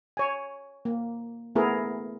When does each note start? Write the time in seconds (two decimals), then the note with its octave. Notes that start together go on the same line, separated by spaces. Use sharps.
0.17 C#5 G#5
0.85 A#3
1.55 A3 B3 E4 G#4 A#4